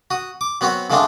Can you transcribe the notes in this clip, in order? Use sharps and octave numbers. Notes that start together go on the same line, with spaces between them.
F#4 D#6
D6
F#3 B3 C4 F#4 C#5
G#2 F3 G#3 A3 C4 D4